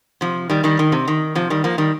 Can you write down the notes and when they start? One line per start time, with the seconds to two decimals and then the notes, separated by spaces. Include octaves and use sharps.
0.21 C3 F3
0.50 D#3 G3
0.64 D#3 G3
0.79 D#3
0.92 C3
1.08 D#3
1.35 C3 F3
1.50 D#3 G3
1.64 F3 A#3
1.78 D#3 G3